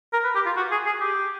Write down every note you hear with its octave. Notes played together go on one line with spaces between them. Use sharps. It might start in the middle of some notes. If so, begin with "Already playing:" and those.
A#4
B4
G4
F4
F#4
G#4
G#4
G4